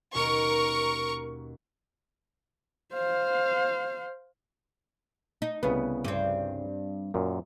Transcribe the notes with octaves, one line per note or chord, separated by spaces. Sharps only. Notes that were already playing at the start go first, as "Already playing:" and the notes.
D#2 B2 C#4 A#4 C#6
C5 F5
D#4
C2 C#3 B3 B4
G2 C4
F#2 A#2